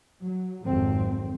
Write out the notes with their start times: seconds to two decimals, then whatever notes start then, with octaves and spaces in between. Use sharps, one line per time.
0.22 F#3
0.63 G#1 F2 F#3 C4